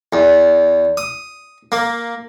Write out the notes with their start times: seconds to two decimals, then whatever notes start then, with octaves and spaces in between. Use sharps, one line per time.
0.13 E2
0.97 D#6
1.72 A#3